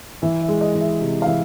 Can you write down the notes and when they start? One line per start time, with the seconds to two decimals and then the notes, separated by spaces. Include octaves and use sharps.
0.22 E3 E5
0.42 E5
0.48 G#3
0.61 D#5
0.75 E3
0.81 E5
1.01 C3
1.22 F5
1.27 E3 E5